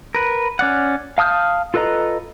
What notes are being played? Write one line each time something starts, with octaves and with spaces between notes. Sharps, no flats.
A#4 B4
C#4 D5 F#5
F5 A5 D#6 F6 G6
F4 A4 B4 D#5 A#5